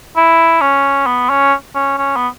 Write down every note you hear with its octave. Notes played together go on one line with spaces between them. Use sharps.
E4
C#4
B3
C#4
C#4
C#4
B3